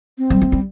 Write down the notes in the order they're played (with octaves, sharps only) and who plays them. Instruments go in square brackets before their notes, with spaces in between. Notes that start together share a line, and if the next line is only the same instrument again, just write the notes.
[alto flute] C4
[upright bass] G3
A3
G3